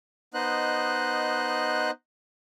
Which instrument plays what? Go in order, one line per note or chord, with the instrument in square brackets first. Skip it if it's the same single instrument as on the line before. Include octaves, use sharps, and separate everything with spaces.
[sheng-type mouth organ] B3 D#4 C5 D#5 F#6